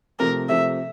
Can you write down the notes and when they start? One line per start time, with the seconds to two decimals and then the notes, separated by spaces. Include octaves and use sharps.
0.19 C3 F3 A3 A#4
0.49 C3 F3 A3 E5